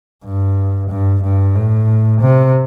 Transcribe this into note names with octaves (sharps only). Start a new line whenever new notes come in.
G2
G2
G2
A2
C3